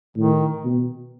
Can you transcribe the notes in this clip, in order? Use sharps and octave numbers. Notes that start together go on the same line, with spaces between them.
A2 D#3
B2